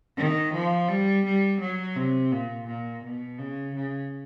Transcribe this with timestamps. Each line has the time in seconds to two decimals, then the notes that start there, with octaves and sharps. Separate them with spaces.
0.17 D#3
0.54 F3
0.89 G3
1.25 G3
1.61 F#3
1.96 C3
2.32 A#2
2.67 A#2
3.04 B2
3.39 C#3
3.75 C#3